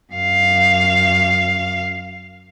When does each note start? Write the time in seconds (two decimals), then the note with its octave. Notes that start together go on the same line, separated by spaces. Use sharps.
0.13 F#2 F5